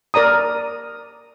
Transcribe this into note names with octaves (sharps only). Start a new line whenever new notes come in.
A#4 D5 A#5 D#6